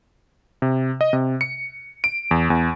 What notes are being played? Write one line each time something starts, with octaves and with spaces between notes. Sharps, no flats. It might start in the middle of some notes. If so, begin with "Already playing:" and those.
C3
D#5
C3
C#7
D7
E2
E2